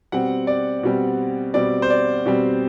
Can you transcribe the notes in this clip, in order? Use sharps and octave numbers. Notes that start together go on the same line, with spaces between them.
B2 G3 C4 F#5
D5
B2 G3 C4
B2 G3 C4 D5
C5
D5
B2 G3 C4